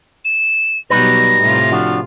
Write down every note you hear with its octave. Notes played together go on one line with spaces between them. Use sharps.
E7
B2 F#3 G3 D#4 G4 B4 A#6
A2 C3 F4
F3 D4 F#4